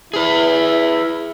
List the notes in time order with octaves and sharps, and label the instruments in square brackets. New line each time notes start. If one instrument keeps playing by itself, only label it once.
[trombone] E4 [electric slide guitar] G#4 B4